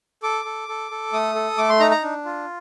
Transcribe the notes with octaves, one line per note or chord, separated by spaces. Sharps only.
A4 D6
A4
A4
A4
A3 D#6
A4
A3 D6
C6
D#4 A#5
A#5
D4
F4